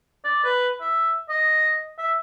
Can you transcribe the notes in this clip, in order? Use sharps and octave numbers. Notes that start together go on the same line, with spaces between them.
D5
B4
E5
D#5
E5